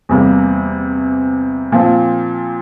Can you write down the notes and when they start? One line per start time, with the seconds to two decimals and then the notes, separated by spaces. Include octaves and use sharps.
0.09 E2 C3 G3 A#3
1.72 A#2 F3 C4